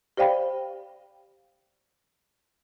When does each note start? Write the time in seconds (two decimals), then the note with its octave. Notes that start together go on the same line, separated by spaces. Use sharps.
0.17 G4 C5 D5 F5 G5 B5